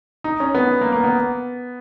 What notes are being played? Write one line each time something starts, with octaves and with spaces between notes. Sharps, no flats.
D#4
C#4
B3
A#3
A#3
B3